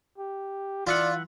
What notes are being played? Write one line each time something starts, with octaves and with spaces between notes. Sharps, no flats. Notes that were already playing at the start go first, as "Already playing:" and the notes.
G4
E3 F4 D5 E5 F#5